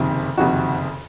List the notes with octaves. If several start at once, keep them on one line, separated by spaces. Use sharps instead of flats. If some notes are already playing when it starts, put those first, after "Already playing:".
Already playing: F#1 F2 C3 D#3
F#1 F2 C3 D#3 F#4